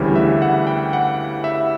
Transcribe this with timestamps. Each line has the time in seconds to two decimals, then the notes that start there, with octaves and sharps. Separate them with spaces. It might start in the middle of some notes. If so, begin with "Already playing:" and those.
Already playing: D2 C#3 E3 G3 C#5
0.16 E5
0.42 F#5
0.67 G5
0.93 F#5
1.44 E5